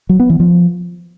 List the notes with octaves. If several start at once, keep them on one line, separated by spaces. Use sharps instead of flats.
F#3
B3
E3
F3